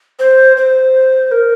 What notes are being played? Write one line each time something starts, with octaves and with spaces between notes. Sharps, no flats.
C5
C5
A#4